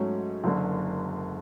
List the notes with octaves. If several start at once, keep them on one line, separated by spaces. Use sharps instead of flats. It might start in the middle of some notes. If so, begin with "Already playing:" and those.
Already playing: G#2 F#3 A3 C#4
F#1 F#2 D3